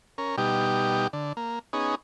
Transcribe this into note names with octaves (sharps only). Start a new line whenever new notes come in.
C#4 A#4
B2 G3 D#4 G4
D3
A#3
B3 C#4 D#4 G#4